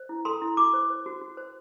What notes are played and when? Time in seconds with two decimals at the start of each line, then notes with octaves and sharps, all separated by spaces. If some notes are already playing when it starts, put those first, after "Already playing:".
Already playing: C5
0.09 E4
0.25 A4 C6
0.42 E4
0.57 F#4 D6
0.74 C5
0.90 C5
1.06 F#4
1.21 F#4
1.37 C5